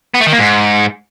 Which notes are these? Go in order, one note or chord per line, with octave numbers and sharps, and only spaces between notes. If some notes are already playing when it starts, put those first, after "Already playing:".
B3
A3
D#3
A#3
G#2